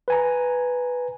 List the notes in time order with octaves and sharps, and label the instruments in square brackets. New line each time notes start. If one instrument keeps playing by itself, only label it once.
[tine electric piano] B4 G#5 A#5